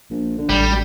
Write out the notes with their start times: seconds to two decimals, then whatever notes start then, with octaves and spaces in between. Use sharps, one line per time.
0.10 A#1
0.38 D3
0.49 A1 G3
0.70 F#2